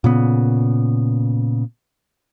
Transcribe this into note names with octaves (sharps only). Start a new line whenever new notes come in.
A#2 C#3 B3